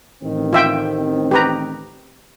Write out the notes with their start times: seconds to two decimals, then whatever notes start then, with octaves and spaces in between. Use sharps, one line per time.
0.23 A1 D#3 C4
0.53 F4 E5 G5
1.31 G4 B4 A#5